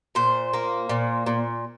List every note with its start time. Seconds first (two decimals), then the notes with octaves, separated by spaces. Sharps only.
0.15 A#2 C5
0.53 A#3
0.89 A#2
1.26 A#2